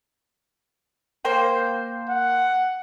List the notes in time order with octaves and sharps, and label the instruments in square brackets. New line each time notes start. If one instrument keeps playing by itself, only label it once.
[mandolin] A#3 C5 G5
[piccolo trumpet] F#5